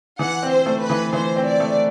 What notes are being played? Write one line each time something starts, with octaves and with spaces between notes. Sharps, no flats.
E3 F#5
C4
C5
A3
B4
E3
E3 C5
C4
D5
A3